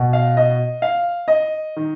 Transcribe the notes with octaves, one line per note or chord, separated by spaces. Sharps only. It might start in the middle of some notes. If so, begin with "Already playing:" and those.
Already playing: B2
F5
D#5
F5
D#5
D#3